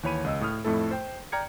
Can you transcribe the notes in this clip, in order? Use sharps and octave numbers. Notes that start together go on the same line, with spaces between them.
D#2 E3 C#5 B5 D#7
C#2 D#5 E6
A2 D#6 F6
F2 A2 A3 E4 A4
C5 G5
D5 G5 A#5 F6 G#6 C#7